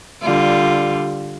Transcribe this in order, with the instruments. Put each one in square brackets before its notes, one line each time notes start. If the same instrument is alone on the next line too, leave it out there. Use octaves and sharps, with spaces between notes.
[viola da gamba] D3 G3 F4